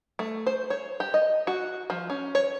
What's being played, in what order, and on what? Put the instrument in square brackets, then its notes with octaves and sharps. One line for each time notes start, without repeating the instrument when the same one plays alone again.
[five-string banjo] A3
C5
C#5
G4
D#5
F#4
F3
C#4
C#5